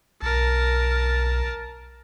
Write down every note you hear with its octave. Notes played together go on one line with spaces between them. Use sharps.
B1 A#4 A5